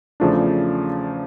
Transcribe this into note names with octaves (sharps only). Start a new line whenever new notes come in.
E2 C#3 F3 A3 D4